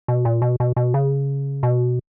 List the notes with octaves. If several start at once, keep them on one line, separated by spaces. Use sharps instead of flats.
B2
A#2
B2
B2
B2
C#3
B2